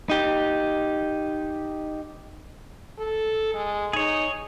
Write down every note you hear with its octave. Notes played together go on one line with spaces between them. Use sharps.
D#4 G4
A4
G#3
D#4 G#4 C#5